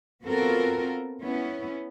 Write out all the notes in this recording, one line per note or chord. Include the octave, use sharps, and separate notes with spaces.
B3 C4 F4 F#4 A4 A#4
B3 C#4 E4